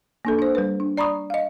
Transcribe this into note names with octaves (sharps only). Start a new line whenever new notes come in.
A#3 D4 A4
D4 C5
G3 B4
D4
D5 A#5 B5 C#6 D#6
D#5 F5